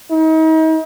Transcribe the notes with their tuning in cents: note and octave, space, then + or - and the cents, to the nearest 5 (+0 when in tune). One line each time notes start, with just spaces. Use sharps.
D#4 +40